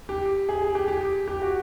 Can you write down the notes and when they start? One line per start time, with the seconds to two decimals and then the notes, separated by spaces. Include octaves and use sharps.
0.09 G4
0.49 G#4
0.62 G#4
0.75 G4
0.88 G4
1.28 G4
1.42 F#4